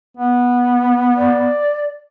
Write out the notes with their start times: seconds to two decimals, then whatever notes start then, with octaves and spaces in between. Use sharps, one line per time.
0.17 B3
1.16 D5